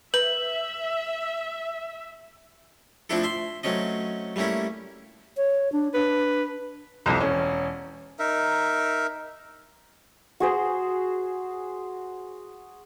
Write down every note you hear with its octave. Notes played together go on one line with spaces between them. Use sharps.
B4 E5 F#7
F3 A3 C4 D4 E4 A4
E5 C6
F#3 A3 C4 C#4 D#5
G3 A3 A#3 C#4 E4
C#5
D4
D4 B4
C2 F2 C3
E1 C#4
D#4 A#4 E5
F#4 G#4 C5